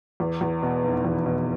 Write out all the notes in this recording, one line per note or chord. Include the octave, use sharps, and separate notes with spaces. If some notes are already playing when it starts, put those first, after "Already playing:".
E2
E2
B2
F1
E2
B2